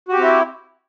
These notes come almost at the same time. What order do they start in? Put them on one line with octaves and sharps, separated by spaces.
F#4 G4 C4 E4